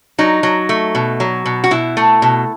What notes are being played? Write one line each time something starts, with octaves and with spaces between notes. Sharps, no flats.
F#3 D#4
F#3
A3
B2
F#3
B2
F#4
B2 E4
A3
B2